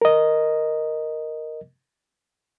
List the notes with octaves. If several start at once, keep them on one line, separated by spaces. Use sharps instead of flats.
A#4 D#5